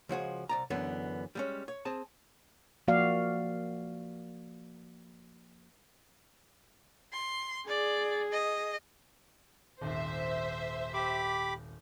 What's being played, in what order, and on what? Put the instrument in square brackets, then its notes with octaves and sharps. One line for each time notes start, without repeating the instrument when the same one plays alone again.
[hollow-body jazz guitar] C#2 F3 F#4 G#4
C2 D5 A#5
F#2 D3 E3 B3
G3 G#3 C#4
C#5
C4 G#4 A5
[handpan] F3 A#3 F#4 D5 F5
[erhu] C6
[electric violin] G#4 [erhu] D5
[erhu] D#5
[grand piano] D#1 G#1 [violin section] C5 E5
[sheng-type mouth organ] G4 B5 D6